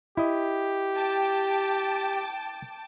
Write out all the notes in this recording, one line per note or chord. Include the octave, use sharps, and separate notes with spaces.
E4 G4 D#5
G5 A5 D6